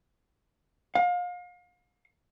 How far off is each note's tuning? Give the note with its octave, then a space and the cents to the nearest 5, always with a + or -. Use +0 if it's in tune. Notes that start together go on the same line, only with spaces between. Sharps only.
F5 +35